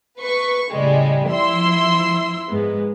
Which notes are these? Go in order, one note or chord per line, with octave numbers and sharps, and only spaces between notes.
B4 C#6
A2 C#3 G3 G#3
F3 E4 C6 E6
G#2 G#3 B3